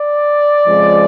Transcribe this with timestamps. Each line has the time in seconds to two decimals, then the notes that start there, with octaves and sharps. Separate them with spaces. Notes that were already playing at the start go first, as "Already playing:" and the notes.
Already playing: D5
0.67 F2 C#3 F3 G#3